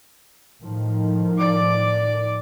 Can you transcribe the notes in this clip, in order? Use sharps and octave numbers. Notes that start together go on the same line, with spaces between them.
A2 D#3 F3
D5 D6